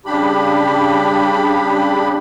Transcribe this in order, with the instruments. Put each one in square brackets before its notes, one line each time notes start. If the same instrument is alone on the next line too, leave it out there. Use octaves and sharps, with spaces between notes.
[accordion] C#3 G3 D4 G4 B5